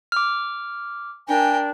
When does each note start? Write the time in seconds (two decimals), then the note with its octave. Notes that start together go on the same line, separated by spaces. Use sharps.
0.12 D6 F6
1.28 D4 A#4 G5 G#5